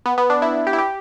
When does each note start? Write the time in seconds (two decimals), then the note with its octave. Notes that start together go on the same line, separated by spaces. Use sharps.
0.06 B3
0.18 B3
0.30 D4
0.42 E4
0.67 G4
0.73 E4
0.78 G4